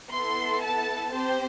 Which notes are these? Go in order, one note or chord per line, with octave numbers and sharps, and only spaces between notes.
B3 E4 A4 C6
A5
C4 G4 C5